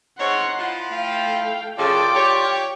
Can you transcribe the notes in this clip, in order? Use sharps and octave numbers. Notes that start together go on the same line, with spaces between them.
G#2 C4 D#4 C#5 F#5 C6
F3 E4 F4
A3 F5 G5
F#2 C#3 F4 A4 D5 G5 D6
G4 C#5